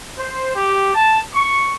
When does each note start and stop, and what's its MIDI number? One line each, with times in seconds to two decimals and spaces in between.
0.17 0.50 72
0.55 0.90 67
0.95 1.19 81
1.34 1.75 85